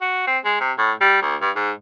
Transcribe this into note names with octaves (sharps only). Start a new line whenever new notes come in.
F#4
C4
G#3
C3
A2
G3
D2
G2
G#2